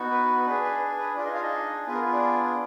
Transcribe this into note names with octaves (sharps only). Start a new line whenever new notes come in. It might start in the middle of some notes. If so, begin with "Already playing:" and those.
Already playing: B3 D#4 F#4
B4
D4 G#4 B4
B4
B4
D4 F4 G#4 D5
D#4 D#5
F4 F5
D#4 D#5
B3 F4 G#4 B4
A#4
B4
D4 D5